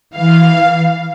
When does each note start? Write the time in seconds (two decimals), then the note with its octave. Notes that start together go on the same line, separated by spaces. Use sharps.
0.14 E3 F5